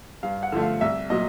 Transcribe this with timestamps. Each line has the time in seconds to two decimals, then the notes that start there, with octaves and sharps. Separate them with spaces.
0.23 G2 F5
0.43 F#5
0.52 D3 F3 A3
0.62 F5
0.81 C2 E5
1.10 A#2 F#3 D#5